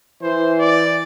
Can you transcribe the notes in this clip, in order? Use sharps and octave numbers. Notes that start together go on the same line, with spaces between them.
E3 C5
D5